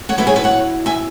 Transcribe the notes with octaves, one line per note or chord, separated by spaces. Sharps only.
C#5 F#5
F#3 E4 B4 E5
G#4 C#5
B4 E5
C#5 F#5
E5 G#5